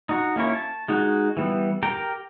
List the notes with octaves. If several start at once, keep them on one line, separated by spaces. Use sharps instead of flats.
D#4 F#4
A#3 C#4 E4 C#5
A5
G#3 D#4 F#4
E3 G3 B3
G4 A#4 G5 A#5